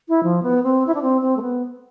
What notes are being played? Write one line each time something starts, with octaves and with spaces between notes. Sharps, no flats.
E4
F3
B3
C4
E4
D4
C4
C4
A3
B3